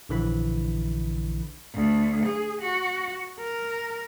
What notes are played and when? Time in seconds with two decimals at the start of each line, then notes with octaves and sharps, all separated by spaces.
0.09 A#1 D3 E3 B5
1.74 D2
2.26 G#4
2.61 F#4
3.39 A#4